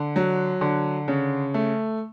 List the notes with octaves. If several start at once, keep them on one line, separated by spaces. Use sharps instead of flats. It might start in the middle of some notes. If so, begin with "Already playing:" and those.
Already playing: D3
F#3
D3
C#3
A3